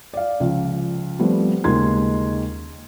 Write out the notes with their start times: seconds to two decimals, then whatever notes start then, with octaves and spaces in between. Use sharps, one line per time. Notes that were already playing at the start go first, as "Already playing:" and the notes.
0.14 D5 F5
0.40 C#2 F3 F5
1.19 F3 G3 A3 B3 C4
1.64 D#2 C#3 G#3 D#4 C6 G#6